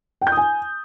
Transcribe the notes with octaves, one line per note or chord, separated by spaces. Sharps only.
G5
G6
D#6
G#5